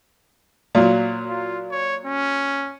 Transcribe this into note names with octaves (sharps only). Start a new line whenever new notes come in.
A#2 F#3
F4
C#5
C#4